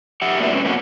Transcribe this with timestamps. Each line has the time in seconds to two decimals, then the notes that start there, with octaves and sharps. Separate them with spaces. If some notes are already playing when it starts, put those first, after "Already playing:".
0.22 G4 E5 F#5
0.39 F#3 A#3 D4 F4 B4 E5
0.52 G#3 C4 C#4
0.65 A#3 B3 C#4 F#4 A#4 B4